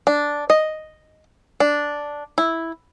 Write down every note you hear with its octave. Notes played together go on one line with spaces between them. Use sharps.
D4
D#5
D4
E4